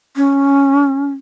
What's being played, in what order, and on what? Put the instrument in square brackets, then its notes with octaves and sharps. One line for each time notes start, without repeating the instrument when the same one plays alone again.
[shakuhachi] C#4